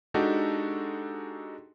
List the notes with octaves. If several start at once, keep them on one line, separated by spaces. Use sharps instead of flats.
G#3 D4 D#4 F#4 G4 A4